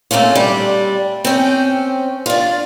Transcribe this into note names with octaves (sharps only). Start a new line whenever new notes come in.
A3 A#3 C4 C#4 F4
G3 D4
C4 C#4 G5
D4 F4